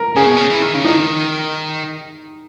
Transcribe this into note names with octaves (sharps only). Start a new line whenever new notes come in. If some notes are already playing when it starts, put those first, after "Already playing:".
Already playing: A#4
C#3 G#4
B2
C#3
E3
D#3
C#3
D#3 D#4